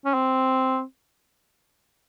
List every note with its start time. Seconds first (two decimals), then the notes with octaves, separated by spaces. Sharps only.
0.05 C#4
0.14 C4